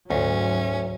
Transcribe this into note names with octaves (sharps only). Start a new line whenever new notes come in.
D2 G#2 F#3 C#4 C#5